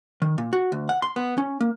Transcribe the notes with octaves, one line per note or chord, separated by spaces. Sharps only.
D#3
A#2
F#4
D2
F#5
C6
B3
C#4
A#3